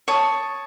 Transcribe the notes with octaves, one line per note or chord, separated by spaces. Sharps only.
C#5 A5 D#6